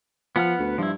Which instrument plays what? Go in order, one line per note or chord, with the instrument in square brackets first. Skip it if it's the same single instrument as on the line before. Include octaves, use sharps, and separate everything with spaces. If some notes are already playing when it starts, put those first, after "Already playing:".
[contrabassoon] F3 [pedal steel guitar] B3 F#5 F6
[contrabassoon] D2
[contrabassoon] G2 [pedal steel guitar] F3 E4